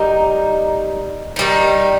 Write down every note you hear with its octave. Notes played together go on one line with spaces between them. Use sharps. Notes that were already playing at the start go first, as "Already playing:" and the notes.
Already playing: G3 D#4 A#4
D#3 G3 D#4